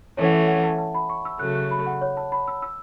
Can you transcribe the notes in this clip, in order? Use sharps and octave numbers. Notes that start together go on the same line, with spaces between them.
E3 A3 C#4 C#5
F#5
E5
F#5
F#5
A5
A5
B5
C#6
E6
C#3 F#3 A3 F#6
F#6
B5
F#5
C#5
A5
B5
E6
E6